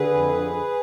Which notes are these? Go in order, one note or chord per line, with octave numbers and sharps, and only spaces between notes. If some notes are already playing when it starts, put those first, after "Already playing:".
Already playing: D3 G#4 B4
F2
D3